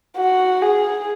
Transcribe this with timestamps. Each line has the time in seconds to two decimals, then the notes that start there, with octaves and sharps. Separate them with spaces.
0.17 F#4
0.62 G#4